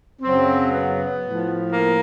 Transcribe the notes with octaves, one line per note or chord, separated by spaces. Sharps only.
F#2 C#3 F#3 C4
B3
A2 F3
A#3